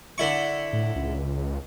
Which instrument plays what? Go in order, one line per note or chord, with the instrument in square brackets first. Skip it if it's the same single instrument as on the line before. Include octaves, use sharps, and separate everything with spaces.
[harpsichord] D3 E4 C#6
[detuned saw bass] A2
C#2